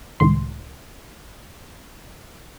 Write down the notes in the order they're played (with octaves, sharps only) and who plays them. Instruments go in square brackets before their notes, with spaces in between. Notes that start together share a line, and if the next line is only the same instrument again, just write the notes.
[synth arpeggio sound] C#2 A2 D#3 C6